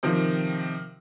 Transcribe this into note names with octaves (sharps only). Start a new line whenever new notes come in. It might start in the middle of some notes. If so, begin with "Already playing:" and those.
C3 D#3 F3